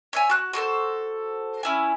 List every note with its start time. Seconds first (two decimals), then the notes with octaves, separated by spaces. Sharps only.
0.13 C#5 E5 G#5
0.30 F#4 F#6
0.53 F#4 G#4 A4 C5
1.63 C#4 E4 G#5